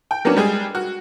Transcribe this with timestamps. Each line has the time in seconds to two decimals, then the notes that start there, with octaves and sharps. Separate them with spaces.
0.11 G5
0.25 F#3 A#3 B3 C#4 D4
0.36 G3 G#3 G#4
0.75 F#4